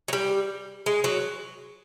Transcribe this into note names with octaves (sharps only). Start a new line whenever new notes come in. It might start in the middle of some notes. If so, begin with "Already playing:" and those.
F#3
G3
G#3
F#3